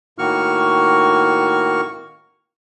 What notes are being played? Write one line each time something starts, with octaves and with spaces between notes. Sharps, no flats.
A2 D#3 A#3 F#4 C#6 F6